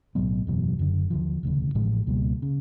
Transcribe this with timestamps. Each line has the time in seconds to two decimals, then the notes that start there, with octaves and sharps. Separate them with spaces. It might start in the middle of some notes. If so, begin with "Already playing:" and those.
0.15 B1 A2 F#3 B3
0.47 F#1 E2 B2 F#3
0.79 F#1 F#2 D3
1.10 D#2 D3 F3
1.43 E1 D2 C#3
1.75 A1 A2 F3 G#3
2.07 C#2 B2 G3 A#3
2.42 C#3